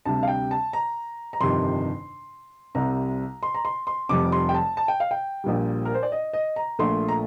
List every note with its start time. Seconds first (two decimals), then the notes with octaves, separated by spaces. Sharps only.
0.05 D2 C3 G3 A5
0.23 F5
0.28 G5
0.51 A5
0.73 A#5
1.33 A#5
1.41 G1 F2 C3 D#3 G3 C6
2.75 C2 C3 G3 A#5
3.43 C6
3.55 A#5
3.65 C6
3.87 C6
4.09 F1 F2 C3 G3 D6
4.32 C6
4.49 G5
4.54 A5
4.77 A5
4.88 G5
5.00 F5
5.11 G5
5.44 A#1 A#2 G3
5.85 A#4
5.94 C5
6.03 D5
6.12 D#5
6.33 D#5
6.56 A#5
6.79 A#1 A#2 A3 C6
7.08 A#5